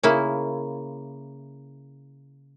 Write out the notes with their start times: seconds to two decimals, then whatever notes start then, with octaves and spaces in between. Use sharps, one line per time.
0.03 C#3 A#3 E4